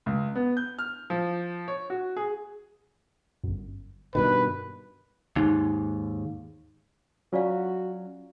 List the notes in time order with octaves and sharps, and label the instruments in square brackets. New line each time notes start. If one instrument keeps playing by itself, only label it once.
[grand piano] C#2
B3
G6
F6
F3
C#5
F#4
G#4
[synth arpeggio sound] G1 F#2
[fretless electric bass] G2 B2 D#3 [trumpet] B4
[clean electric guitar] D#2 G#2 [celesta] D#4
[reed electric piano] F#3 C#4 [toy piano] F4 D5 F5 [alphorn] F#4